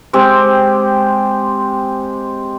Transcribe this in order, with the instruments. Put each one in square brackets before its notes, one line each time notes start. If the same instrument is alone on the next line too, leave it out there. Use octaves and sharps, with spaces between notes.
[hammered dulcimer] G#3 C4 G4